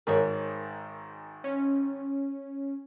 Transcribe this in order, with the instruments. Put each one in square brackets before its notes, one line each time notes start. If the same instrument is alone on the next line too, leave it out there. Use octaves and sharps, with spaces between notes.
[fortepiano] G#1 G#2 [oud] A#4 C#5
[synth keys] C#4